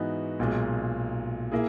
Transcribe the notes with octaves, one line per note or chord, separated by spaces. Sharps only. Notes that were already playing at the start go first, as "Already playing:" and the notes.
Already playing: G#2 E3 B3 D#4 F#4
B1 A#2 G#3
A#3 E4 G#4